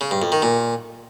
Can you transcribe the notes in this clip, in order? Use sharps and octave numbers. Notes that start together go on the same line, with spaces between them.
C#3
G2
F2
D#3
A#2